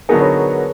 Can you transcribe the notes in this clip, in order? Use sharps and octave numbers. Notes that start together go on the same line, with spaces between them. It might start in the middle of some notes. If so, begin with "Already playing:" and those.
D3 F#3 B3 D#4 G#4 A#4
B4 C#5